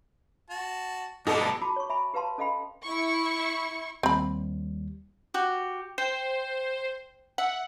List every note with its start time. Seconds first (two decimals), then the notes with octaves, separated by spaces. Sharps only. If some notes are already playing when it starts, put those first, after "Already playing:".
0.50 F#4 A5
1.27 G2 B2 G3 D4 D#4 A4
1.61 F#4 A5 B5 D6
1.76 C#5 C#6
1.89 E5 G#5 B5
2.14 G4 B4 F5 A5 C6
2.38 C#4 A4 D#5 F5 G5 B5
2.84 E4 C#6
4.03 D#2 D#3 G3 C4 B5
5.34 F#4 G4
5.98 C5 G5
7.38 E5 F#5